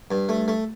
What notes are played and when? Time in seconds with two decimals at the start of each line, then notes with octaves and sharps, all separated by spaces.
0.11 G2
0.29 A3
0.48 A3